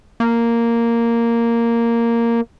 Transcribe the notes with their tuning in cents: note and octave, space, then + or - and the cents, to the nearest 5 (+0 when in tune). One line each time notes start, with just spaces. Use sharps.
A#3 -5